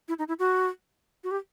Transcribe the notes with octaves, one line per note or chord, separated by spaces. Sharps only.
E4
D#4
E4
F#4
F#4
G4